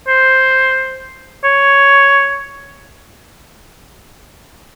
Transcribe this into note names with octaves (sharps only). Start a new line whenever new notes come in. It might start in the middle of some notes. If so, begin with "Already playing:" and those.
C5
C#5